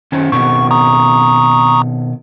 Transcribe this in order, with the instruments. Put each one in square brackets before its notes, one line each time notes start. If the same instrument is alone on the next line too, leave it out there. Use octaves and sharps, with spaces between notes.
[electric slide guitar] D#3 C#4 C5
[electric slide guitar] B2 D#3 C4 [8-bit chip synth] C#6
[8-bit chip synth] A#5 C#6 D#6